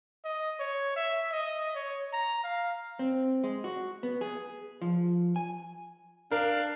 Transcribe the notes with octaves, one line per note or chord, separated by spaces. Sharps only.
D#5
C#5
E5
D#5
C#5
A#5
F5
C4
G#3
F#4
B3
G#4
F3
G#5
D4 A#4 F5